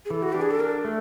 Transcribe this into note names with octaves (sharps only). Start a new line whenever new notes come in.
G#4
E3 A4
F#4
D4 G4
G#4
A4
D4 A#4
A3